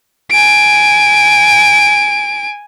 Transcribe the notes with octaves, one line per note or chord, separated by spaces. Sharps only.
G#5 D7